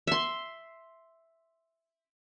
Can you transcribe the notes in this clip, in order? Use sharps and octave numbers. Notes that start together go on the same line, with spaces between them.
E5 C6